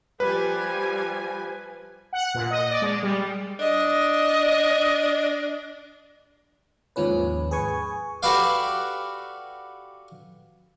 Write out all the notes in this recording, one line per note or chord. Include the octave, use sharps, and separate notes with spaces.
F3 G3 B4 G#5
F#5
A#2
D#5
D5
G#3
G3
D4 D#5
D#2 G#2 F3 C#4 B4
G#4 B4 G#5 C#6
F#4 G4 A4 B4 D5 F5